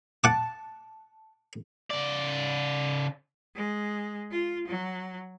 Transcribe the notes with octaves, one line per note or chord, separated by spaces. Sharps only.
F#5 A5 D6
C#3 D5
G#3
F4
F#3